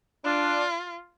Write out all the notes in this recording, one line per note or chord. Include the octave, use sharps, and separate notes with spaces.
D4 F4